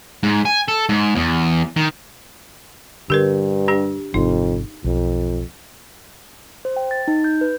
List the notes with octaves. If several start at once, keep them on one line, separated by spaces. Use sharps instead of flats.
G#2
G#5
A4
G#2
E2
D#3
G2 D3 G4 A#4 B4
D4 G4
G#1 F2 C3 D#4
B1 F2
C5
G5
A6
D#4
G6
B4